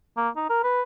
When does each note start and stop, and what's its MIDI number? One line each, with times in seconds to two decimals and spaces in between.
0.17 0.29 58
0.36 0.45 63
0.49 0.62 70
0.63 0.82 71